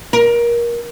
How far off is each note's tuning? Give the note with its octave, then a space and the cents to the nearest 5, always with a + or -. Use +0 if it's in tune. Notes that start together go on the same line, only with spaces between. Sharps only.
A#4 +20